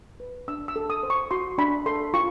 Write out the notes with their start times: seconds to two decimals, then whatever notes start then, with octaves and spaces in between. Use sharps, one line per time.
0.20 B4
0.48 D4 E6
0.68 E6
0.76 A4
0.90 D#6
1.03 C5
1.10 C#6
1.31 F#4 C6
1.58 D4 B5
1.86 A4 C6
2.14 F4 C#6